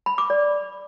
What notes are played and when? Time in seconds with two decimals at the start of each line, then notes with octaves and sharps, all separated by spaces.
0.06 B5
0.18 D6
0.30 D5